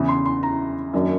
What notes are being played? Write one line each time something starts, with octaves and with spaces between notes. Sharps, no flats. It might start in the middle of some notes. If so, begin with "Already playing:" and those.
Already playing: E2 C#3 E3
C6
C6
A#5
F#2 D#3 F#3 A#3 D4